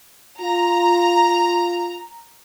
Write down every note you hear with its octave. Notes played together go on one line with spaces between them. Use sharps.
F4 A#5